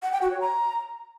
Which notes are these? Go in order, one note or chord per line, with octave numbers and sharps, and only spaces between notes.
F#5
G5
F#4
C#5
A#5